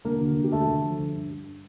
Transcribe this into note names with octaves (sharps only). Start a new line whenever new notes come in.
D3 A#3 A#4
D2
D3
G4
D2 A3 A4
D2
F3
D3
G2
G2